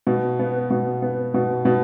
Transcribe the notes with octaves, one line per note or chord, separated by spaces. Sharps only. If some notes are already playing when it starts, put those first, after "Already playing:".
B2
B3
B2
B3
B2
B2